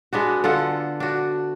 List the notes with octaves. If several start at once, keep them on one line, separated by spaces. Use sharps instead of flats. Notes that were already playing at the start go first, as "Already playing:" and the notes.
G#3 B3 D4 F#4
D3 F4 A4 F#5
D4 F#4